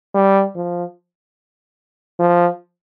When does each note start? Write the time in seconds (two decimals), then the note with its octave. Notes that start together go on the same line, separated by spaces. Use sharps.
0.15 G3
0.55 F3
2.20 F3